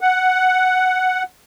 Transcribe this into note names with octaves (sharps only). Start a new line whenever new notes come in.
F#5